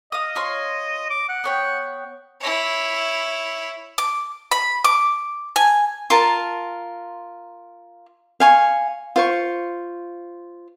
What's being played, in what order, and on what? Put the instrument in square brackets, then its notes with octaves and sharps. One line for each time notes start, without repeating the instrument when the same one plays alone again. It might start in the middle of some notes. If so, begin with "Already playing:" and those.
[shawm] D#5 [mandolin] F5 D#6
[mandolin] F4 C#5 C6
[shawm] D6
F#5
[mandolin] B3 C#5 G5
[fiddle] E4 C#5
[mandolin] D6
B5
D6
G#5
[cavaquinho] F4 A#4 A5
F5 G#5 C#6
F4 C5 C#6